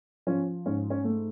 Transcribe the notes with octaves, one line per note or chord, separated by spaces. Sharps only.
F3 C#4
G#2 C#4
C#4
A3